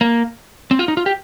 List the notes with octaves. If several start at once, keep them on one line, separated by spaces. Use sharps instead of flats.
A#3
C4
F4
D#4
F4
G4